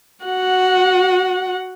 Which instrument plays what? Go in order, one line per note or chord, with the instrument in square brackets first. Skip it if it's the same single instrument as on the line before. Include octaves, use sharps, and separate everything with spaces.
[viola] F#4 F#5